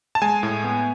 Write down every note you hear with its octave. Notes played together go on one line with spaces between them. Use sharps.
A5
G#3 G#5
A2
B3